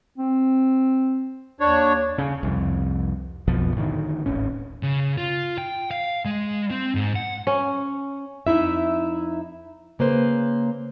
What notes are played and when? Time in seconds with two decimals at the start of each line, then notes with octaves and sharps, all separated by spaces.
0.18 C4
1.60 D#2 D4 C#5
2.18 C#3
2.43 C2 F2
3.48 B1 F2 B2 F3
3.77 A2 D3 D#3
4.26 D1 G#1 C#4
4.83 C#3
5.18 F4
5.58 G5
5.91 F5
6.25 G#3
6.70 C4
6.95 G#2
7.15 F#5
7.47 C#4
8.47 F2 D#4 E4 E5
9.99 C#3 A#3 B4 C5